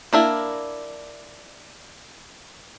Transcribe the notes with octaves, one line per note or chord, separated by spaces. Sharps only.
A#3 D4 E4 A#4